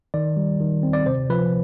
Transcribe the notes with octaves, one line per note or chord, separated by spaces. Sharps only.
D#3 D5
G3
D#3
C4
D5
C3 C5
F3 B4